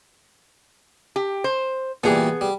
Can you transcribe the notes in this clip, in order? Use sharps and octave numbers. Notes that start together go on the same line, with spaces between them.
G4
C5
A#2 E3 G3 B3 G#4
G3